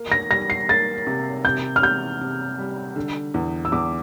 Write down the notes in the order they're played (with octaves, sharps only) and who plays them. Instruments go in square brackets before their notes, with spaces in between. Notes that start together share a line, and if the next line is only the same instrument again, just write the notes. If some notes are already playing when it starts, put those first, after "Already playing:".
Already playing: [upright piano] A#3
[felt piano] A#6
[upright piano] G3 [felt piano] A#6
[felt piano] C7
[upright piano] A#3 [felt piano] A6
[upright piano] C3
[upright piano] C3 [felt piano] G6
[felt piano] F6
[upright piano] C3 [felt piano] G6
[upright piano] C3
G3
D3
E2
[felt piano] E6
[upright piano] E2 [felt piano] D6